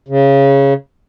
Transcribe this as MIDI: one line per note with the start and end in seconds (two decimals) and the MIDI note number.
0.09 0.74 49